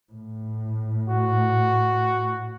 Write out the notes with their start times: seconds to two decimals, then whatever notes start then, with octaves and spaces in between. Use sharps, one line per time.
0.13 A2
1.09 F#4